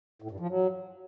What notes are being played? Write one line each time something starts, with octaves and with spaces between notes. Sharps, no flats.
A2
G2
F3
F#3